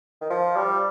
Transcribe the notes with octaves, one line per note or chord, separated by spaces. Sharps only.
D#3
F3
G3